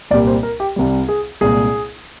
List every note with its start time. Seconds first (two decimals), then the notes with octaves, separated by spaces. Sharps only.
0.11 C2 A#2 G3 A#3 D5
0.27 C5
0.43 A#4
0.60 G4
0.76 C2 C3 G3
1.09 G#4
1.41 C2 A#2 G#3 G#4